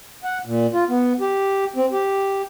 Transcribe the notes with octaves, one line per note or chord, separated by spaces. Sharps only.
F#5
A#2
F4
B3
G4
C4
G4